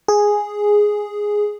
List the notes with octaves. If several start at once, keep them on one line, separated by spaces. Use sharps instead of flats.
G#4